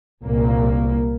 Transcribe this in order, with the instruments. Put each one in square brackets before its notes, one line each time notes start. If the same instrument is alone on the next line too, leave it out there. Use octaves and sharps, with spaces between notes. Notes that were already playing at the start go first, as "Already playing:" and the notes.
[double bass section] C2 A#2 A#3